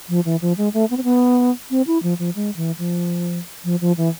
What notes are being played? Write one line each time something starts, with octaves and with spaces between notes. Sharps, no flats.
F3
E3
F3
G#3
A3
B3
C4
B3
C4
E4
F3
F3
G#3
E3
F3
F3
F3
E3